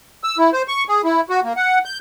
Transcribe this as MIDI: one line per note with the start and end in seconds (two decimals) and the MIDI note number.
0.24 0.38 88
0.38 0.50 64
0.53 0.62 72
0.68 0.84 85
0.89 1.02 68
1.04 1.21 64
1.30 1.40 66
1.44 1.53 58
1.57 1.79 78
1.85 1.99 91